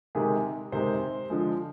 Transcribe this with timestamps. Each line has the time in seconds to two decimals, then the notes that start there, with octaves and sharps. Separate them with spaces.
0.15 C3 D#3 G#3 G#4
0.72 C3 D#3 G#3 C5
1.30 D3 F3 G#3